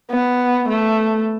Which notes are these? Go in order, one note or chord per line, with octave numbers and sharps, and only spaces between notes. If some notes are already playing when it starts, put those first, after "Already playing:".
B3
A3